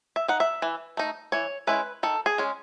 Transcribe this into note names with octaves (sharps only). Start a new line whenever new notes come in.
E5
D#4 F#5
E5
E3
A3 D#4
E3 C#5
G#3 C#4 E4 B4
D#3 A4
G#4
G#3 C#4